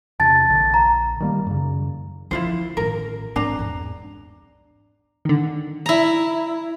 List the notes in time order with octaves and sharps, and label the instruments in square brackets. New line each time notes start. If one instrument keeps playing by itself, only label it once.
[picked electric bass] E2 C3 [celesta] A5 A6
[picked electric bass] A#1 D3
[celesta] A#5
[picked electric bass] D#3 G3 A#3
F#2 C#3
[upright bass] D3 F3 [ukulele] E4 F4 C5
[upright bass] A1 D#3 [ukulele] A#4
[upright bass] G#2 C4 [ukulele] D4 A#5
[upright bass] E2 G#2
[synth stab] D3 D#3
[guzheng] E4 A#5